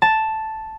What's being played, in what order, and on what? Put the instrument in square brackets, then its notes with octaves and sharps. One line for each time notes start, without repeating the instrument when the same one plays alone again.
[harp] A5